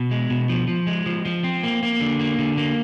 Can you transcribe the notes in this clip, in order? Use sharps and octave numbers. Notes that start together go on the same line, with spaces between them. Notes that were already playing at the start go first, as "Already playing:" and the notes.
Already playing: B2
G#3
B2
F3
F3
G#3
F3
F3
C4
A#3
A#3
D3
A#3
D3
A#3